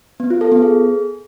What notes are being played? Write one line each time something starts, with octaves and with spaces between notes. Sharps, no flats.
B3
F4
A4
B3
G#4